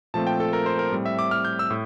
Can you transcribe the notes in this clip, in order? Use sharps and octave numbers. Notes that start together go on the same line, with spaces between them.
A#2 F3 A3 C4 A5
G5
A4
A#4
C5
A#4
A2 G3 C4
E5
D6
F6
G6
E6
A2